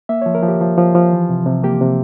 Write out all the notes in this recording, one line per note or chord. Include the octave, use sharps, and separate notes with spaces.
A#3 E5
F3 C#5
A#4
F3
G4
F3
F3
F3
E3
C3
C3
A#3 G4
C3